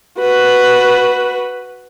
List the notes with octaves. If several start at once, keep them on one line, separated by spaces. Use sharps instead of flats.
F#4 B4